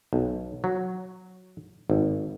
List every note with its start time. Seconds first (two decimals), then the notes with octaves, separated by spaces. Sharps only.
0.13 B1
0.64 F#3
1.90 G#1